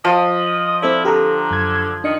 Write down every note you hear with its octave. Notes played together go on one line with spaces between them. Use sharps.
F3 D#5
C4 E4 A4 D5
D3 G4 A4 A#5
F#2 G#6
D#3 D4 D#5 C#7